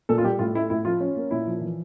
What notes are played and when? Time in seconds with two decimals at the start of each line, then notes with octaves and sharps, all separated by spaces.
0.09 A#2 A4
0.18 F4
0.24 G3 G4
0.39 A2 F4
0.54 A3 E4
0.70 A2 E4
0.85 F3 F4
1.00 C#4
1.17 A#3
1.31 A#2 E4
1.47 F3
1.61 E3